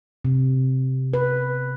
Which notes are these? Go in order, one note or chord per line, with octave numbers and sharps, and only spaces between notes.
C3
B4